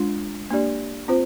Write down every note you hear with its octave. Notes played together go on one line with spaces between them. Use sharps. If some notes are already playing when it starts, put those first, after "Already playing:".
Already playing: G#3 D4 F4
A#3 D4 G4 D5
C4 F4 C5